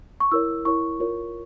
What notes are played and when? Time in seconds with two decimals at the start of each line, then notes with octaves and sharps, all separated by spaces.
0.20 C#6
0.32 E4 A#4 C#5 E6
0.65 E4 A#4 C#5 C#6
1.00 F4 A#4 C#5